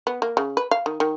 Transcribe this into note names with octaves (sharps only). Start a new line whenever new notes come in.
B3
A#3
C#3
B4
F5
D#3
D#3